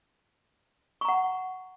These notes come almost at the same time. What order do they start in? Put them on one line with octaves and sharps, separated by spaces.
C#6 A#5 F#5